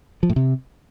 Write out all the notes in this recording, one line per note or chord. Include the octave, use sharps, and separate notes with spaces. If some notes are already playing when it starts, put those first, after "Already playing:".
F3
A2
C3